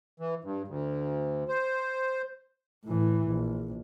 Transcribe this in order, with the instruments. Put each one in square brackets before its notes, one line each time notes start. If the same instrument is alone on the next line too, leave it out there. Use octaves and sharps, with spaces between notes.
[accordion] E3
G2
D2
C5
[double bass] A2 E3
A#1